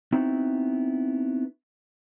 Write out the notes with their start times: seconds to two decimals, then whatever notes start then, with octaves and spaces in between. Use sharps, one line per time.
0.12 B3 C4 D#4 E4 F#4